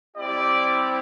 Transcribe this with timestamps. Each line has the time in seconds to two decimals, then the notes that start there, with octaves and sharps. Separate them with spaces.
0.17 G3 C4 E4 G4 D5